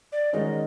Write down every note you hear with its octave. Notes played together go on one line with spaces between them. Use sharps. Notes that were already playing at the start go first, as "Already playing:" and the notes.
D5
D#3 G#3 C#4 F#4 A#4 D#5